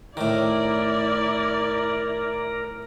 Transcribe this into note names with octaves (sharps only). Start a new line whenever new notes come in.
A2 D#3 E4 A#4 D5